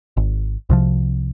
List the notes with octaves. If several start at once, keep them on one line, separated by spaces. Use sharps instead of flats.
G#1
C2 C3 F3